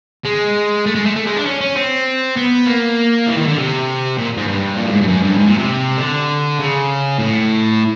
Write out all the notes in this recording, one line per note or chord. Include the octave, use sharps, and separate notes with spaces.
G#3
A3
G#3
A3
A3
G#3
D4
C#4
C#4
C4
B3
A#3
E3
D#3
D3
C3
A#2
G#2
G2
A#2
A2
G#2
G2
F#2
G2
G#2
A#2
C3
D3
C#3
A2